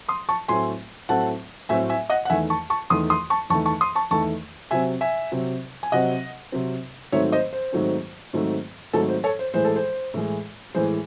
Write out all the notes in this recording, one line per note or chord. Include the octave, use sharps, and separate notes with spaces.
C6 D#6
A5 C#6
A2 F#3 A3 C4 G#5 C6
A2 F#3 A3 C4 F#5 A5
A2 F#3 A3 C4 E5 G#5
E5 G#5
D#5 F#5
F#5
E2 D#3 A3 E5 G#5
A5 C#6
A5 C#6
E2 D#3 A3 C6 D#6
C6 D#6
A5 C#6
E2 D#3 A3 A5 C#6
A5 C#6
C6 D#6
A5 C#6
E2 D#3 A3 A5 C#6
C3 F#3 C4 E5 G#5
E5 G#5
C3 F#3 C4
G#5
C3 F#3 C4 D#5 F#5
C3 F#3 C4
G#2 D#3 F#3 A3 C4 C#5 E5
C5 D#5
C5
G#2 D#3 F#3 A3 C4
G#2 D#3 F#3 A3 C4
G#2 D#3 F#3 A3 C4 A4
C5
A4 C#5
C5
A2 E3 G#3 C5
A4
C5
A2 E3 G#3
A2 E3 G#3 C5